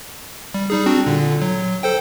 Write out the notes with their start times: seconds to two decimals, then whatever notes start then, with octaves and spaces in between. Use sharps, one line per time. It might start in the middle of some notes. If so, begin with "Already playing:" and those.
0.54 G3
0.70 G3 D#4 G#4
0.86 C4 D4 F#4
1.07 A#2 D3
1.42 F#3
1.83 A4 C5 G5